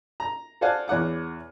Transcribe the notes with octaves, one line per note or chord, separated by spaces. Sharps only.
A#5
A4 C5 D5 F5 F#5 G#5
E2 C#5 F#5 D6